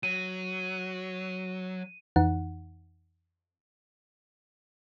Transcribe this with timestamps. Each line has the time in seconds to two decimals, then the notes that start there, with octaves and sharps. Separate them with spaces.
0.03 F#3 D#7
2.16 F2 E3 D#4 F#5